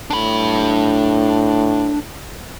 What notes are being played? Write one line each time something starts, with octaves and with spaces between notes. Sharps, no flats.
A2 D4 B5